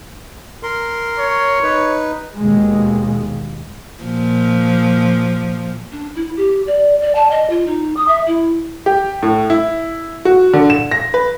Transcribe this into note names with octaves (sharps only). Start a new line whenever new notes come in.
A#4 C6
C#5
D#4 B4
D#2 B2 G#3
A#2 F3
D4
E4
G4
D5
D5
A5
D#5
F4
D#4
D#6
E5
E4
G4
A2
E4
F#4
D3
E7
A#6
B4